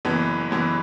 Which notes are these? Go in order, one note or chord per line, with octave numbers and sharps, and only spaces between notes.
F#1 F#2 E3 B3
F#1 F#2 E3 B3